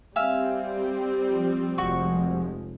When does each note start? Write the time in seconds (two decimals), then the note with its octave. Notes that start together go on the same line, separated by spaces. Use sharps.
0.16 G3 C4 E5 F5 G#5
1.29 F3
1.78 F1 F3 G#3 F#4 C#6